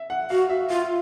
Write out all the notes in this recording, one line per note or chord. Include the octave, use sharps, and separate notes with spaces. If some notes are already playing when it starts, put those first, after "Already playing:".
Already playing: E5
F#5
F#4 F5
E5
F4 F5